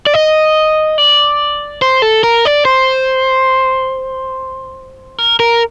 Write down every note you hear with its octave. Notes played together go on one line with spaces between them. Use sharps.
D5
D#5
D5
C5
A4
A#4
D5
C5
A#4
A#4